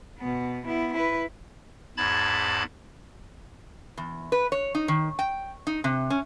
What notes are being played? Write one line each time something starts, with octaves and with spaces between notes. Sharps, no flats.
B2 B3
B3 E4
E4 B4
E2 G#2 A5 B5 G#6 A6
E2
B4
C#5
D#4
D#3
G5
D#4
C3
C#4